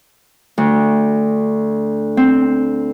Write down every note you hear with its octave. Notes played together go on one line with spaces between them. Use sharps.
D2
C4